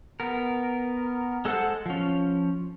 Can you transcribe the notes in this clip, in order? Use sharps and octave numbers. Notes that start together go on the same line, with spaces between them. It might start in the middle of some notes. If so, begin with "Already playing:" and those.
B3 A#4
G#3 A4 C5 F#5 A5
F3 C#4